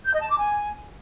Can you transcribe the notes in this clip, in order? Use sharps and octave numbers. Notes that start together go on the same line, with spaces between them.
G6
D#5
A5
D6
G#5